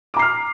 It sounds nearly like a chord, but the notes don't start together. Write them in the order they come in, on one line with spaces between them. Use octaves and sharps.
D6 A#5 C7 F6